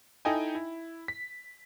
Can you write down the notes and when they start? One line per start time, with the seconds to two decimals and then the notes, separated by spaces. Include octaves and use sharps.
0.25 D#4 E4 A4 D#5 G5 G#5
0.55 E4
1.08 B6